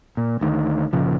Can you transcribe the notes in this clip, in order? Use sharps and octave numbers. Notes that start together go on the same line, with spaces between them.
A#2
D2 D#3
G1 A#2 C#3 F3